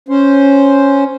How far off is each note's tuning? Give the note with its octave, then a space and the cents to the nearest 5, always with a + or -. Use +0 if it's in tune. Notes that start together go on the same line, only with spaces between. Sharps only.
C#4 +0 C5 +0